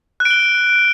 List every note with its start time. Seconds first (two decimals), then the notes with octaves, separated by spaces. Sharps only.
0.20 F#6
0.25 D7
0.31 G7